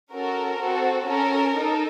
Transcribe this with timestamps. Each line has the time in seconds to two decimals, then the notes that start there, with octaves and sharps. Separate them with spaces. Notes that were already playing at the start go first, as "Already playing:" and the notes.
0.13 C#4 F#4 A4 A#4
0.60 C4 F#4 A4
1.08 C#4 A4 A#4
1.56 D#4 A4